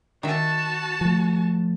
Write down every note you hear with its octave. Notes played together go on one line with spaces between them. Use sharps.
D#3 F#4 E5 A5
F3 A3